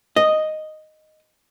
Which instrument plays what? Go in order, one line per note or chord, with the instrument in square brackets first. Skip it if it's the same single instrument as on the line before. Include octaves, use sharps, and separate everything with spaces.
[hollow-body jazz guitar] D#5